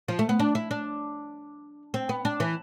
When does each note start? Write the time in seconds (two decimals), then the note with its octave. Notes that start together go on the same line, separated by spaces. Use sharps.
0.08 F3
0.19 A3
0.29 B3
0.39 D4
0.55 E4
0.71 D4
1.94 C4
2.09 B3
2.25 D4
2.40 E3